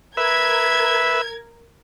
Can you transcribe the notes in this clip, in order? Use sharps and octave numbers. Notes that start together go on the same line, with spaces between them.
A#4 B4 E5 G#6